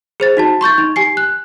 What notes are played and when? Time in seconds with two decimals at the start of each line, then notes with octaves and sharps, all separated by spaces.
0.20 G#4 C5 A6
0.37 D#4 F#4 A5
0.61 C6 C#6 G6 A6
0.78 D#4
0.96 G4 G#5 C7
1.17 F#6